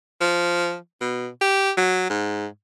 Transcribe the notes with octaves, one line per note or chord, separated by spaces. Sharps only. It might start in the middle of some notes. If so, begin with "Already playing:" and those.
F3
B2
G4
F#3
G#2